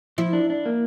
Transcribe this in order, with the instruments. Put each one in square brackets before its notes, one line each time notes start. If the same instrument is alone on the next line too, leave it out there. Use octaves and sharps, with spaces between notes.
[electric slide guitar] F3 [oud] E4
[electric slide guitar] D4
D4
A#3